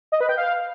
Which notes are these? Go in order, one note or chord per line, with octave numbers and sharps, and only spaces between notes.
D#5
B4
G5
F5